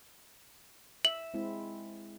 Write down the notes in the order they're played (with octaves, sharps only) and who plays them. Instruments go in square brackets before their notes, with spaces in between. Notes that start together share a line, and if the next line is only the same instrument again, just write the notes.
[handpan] E5 [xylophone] F#7
[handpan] G#3 C4 E4